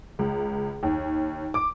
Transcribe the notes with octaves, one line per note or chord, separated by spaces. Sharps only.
C#2
D#2
D6